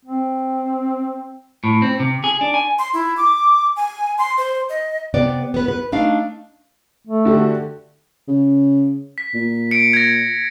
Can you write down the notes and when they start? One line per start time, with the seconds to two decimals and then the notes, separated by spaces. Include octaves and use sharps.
0.05 C4
1.64 A2
1.82 C4
2.00 C3
2.24 G#4
2.41 D4
2.54 G#5
2.78 C6
2.93 E4
3.17 D6
3.76 G#5
4.18 C6
4.37 C5
4.69 D#5
5.14 C3 B3 D5
5.54 B3 B4
5.68 B4
5.92 A3 D4 D#4 F5
7.07 A3
7.25 D3 F#4 G4
8.28 C#3
9.18 B6
9.34 A#2
9.71 C#7 D7
9.93 G#6 A#6